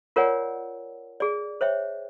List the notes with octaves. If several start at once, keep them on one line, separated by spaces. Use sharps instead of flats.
F4 A#4 C#5 D5 F#5 G#5
G#4 D5
C5 C#5 E5 G5